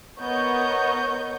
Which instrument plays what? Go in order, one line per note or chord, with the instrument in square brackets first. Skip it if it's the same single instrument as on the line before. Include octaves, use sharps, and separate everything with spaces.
[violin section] B3 A#4 C#5 D#5 C#6 G6